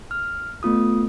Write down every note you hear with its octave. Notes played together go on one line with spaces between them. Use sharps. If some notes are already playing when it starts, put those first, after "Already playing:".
F6
A3 B3 F4 D#6